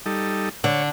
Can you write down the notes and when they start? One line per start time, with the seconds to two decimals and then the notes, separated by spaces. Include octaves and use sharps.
0.06 G3 D#4 A4
0.64 D3 C#5